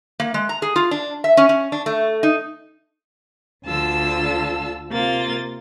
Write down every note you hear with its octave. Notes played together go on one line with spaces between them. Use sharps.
A#3
G#3
A#5
G#4
F4
D4
E5
C#4
C#4
D4
A3
D#4
D2 D3 F4 A5 E6
C3 A#3 F4 A6